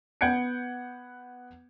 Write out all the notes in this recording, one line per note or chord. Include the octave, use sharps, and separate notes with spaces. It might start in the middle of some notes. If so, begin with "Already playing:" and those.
B3 F#5 G6 G#6 C#7 D7